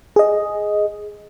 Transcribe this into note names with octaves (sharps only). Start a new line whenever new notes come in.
G#4 D#5